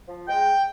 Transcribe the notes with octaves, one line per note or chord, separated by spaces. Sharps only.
F3
G#3 G5